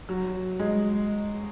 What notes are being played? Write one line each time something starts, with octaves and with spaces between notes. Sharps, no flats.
F#3
G#3